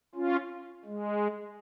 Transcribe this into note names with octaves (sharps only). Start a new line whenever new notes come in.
C#4 F4
G#3